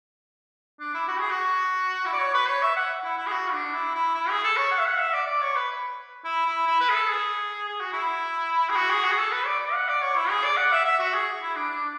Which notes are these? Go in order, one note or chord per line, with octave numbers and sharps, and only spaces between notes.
D4
E4
F#4
G#4
F#4
E4
D5
C#5
B4
C#5
E5
F#5
E4
E4
G#4
F#4
D4
E4
E4
E4
G#4
A4
C#5
F#5
E5
F#5
E5
D5
D5
C#5
B4
E4
E4
E4
B4
G#4
A4
G#4
G#4
F#4
E4
G#4
F#4
G#4
F#4
G#4
A4
B4
D5
D5
F#5
D5
C#5
E4
G#4
D5
F#5
E5
E5
F#4
G#4
E4
D4
D4